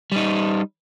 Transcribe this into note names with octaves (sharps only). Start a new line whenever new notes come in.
G3 D#4